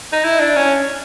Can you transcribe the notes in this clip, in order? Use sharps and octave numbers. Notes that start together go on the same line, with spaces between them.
D#4
E4
D4
C#4